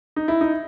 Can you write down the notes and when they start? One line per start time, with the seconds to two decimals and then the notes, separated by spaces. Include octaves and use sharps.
0.16 D#4
0.28 E4
0.41 D#4